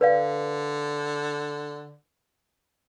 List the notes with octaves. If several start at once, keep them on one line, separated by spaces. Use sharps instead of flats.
D3 B4 D5 F5